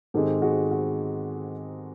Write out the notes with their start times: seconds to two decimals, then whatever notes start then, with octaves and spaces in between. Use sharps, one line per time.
0.14 G#2 D#3 G#3 C4 G4 A4
0.42 F#4 G#4
0.71 F#4